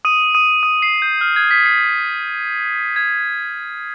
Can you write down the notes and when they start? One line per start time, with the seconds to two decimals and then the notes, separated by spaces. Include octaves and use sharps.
0.05 D#6 D#7
0.35 D#6 D#7
0.63 D#6 D#7
0.82 C7
1.02 G6
1.21 F6
1.36 G#6
1.51 B6
1.66 C7
2.96 G#6